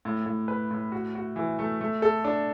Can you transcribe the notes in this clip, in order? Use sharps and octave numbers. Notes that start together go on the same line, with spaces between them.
A2
A2
B4
A2
F#4
F#4
E3
A3
A3
A4
D4